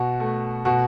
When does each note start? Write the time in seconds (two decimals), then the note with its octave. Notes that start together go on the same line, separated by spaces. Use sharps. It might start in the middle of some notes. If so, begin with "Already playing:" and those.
Already playing: B2 F#4
0.20 A3
0.65 B2 F#4